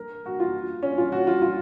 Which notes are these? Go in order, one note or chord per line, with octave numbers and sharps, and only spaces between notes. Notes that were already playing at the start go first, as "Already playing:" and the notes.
Already playing: A#4
F#4
F4
C#4
F4
F#4
F4
F4